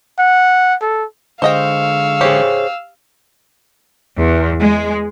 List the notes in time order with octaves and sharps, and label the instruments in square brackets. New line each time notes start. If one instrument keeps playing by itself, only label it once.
[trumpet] F#5
A4
[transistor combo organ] D3 G#3 C#6 [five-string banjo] C5 D#5 G5 [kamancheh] F5 E6
[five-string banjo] G4 [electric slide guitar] G#4 C5 C#5
[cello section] E2
G#3